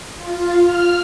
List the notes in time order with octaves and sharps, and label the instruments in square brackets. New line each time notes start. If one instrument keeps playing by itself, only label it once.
[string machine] F4
F6